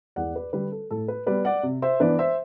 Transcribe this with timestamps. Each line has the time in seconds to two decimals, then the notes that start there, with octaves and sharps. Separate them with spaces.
0.16 E2 D5 F#5
0.36 B4 D5
0.53 D3 G3 B4
0.72 A4
0.91 A2 A4
1.08 B4
1.26 G3 B3 B4 D5
1.45 D5 F#5
1.63 C3
1.82 C5 E5
2.00 E3 B3 D4 B4 D5
2.19 C5 E5